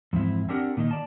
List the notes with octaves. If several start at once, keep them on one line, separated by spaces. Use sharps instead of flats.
F2 G#2 E3 C4 E4
C4 D4 G4 A#4 F#5
A#2 D#3 D#5
D5 A5